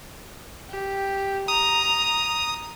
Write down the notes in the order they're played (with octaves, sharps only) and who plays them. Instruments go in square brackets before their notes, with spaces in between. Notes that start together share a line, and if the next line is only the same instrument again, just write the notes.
[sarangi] G4
[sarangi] A#5 [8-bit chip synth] D#6